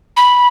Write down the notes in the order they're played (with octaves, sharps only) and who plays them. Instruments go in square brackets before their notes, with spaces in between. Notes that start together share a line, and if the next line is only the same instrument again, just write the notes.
[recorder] B5